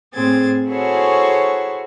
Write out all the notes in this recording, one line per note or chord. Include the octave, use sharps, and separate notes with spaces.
A2 C4 G#4 G#6 A6
E4 F#4 G#4 A4 C5 C#5